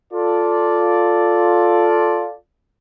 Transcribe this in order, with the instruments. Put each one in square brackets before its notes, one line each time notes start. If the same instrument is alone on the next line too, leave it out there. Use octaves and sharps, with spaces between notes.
[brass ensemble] F4 A4 D5